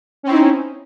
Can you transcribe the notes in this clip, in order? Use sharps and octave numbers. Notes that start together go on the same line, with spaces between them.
C4 C#4 D#4 E4